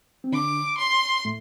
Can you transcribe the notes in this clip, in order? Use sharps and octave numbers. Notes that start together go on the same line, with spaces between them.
C4
D3 D4 D6
C6
A2 A3